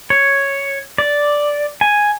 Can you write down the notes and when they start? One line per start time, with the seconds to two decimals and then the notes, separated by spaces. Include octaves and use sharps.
0.10 C#5
0.98 D5
1.81 G#5